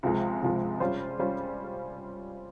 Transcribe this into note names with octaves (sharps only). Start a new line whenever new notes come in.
C#2 C3 F3 G#3
C#2 C3 F3 G#3
G3 C#4 F4 C5
G3 C#4 F4 C5